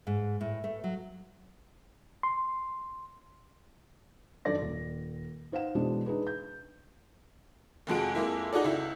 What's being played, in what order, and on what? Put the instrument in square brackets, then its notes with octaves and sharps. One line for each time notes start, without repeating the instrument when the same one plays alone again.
[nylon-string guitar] G#2
A2
A3
F#3
[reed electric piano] C6
[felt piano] F#2 D#3 D4 A4 D5 A#6
D#1 A4
D#4 C5 F5 F#5 E7
B2 E3 G#3 B3 D4
D4 D#4 G#4 B4
G6
[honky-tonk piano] F1 F2 G#3 F#4 D7
F2 G#3 A#3 E4
D#4 F#4 G#4 A4 D5
C#2 E4